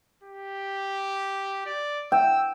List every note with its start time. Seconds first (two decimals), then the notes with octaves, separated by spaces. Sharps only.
0.23 G4
1.66 D5
2.12 G5 E6